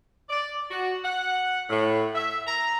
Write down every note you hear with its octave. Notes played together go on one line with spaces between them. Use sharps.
D5
F#4
F#5
A2
E5
A#5